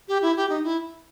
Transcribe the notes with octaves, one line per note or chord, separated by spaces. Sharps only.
G4
E4
G4
D#4
E4